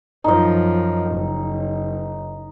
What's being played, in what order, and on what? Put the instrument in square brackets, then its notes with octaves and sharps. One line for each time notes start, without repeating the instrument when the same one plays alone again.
[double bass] F#2 F3 [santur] D#4 D#5
[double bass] F#1